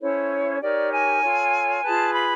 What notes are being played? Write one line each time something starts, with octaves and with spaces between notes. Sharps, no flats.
C#4 E4 A4 C5 C#5
D#4 G4 A#4 C#5 D5
G#5
F4 A4 C#5
F4 G#4 B4 A5
B5